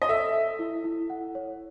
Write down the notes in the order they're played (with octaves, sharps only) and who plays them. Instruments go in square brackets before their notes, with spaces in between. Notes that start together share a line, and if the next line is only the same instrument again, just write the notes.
[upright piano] D#5
[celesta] A4 [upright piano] E5
[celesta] A4
E4
E4
F#5
C#5